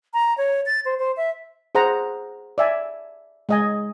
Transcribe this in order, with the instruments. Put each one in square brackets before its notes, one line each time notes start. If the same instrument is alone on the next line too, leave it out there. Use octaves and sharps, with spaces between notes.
[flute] A#5
C#5
A6
C5
C5
E5
[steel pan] G#4 C5 F#5 A#5
D5 E5 G#5
G#3 D#5 G#5